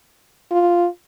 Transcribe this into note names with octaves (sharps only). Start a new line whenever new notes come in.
F4